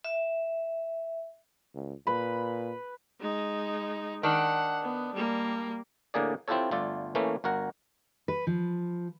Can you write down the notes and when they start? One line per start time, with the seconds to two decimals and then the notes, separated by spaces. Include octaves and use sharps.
0.05 E5
1.74 C#2
2.07 A#2 B4 B5
3.21 G#3 D#4
4.23 D#3 D4 F#5
4.83 B3
5.15 G3 A#3
6.14 A2 D3 A#3 G#4 D5
6.48 C4 E4 F4 G4 A4 C#5
6.71 G1 A3 F4 A4 D5
7.15 E3 A3 A#3 C#4 E4
7.44 G1 F#4 A#4 F#5
8.28 B4
8.47 F3